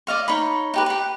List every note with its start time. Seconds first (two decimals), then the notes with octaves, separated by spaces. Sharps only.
0.07 D5 D#5 F5 C#6
0.28 D#4 C#5 B5
0.74 D#4 G4 B4
0.86 G4 B4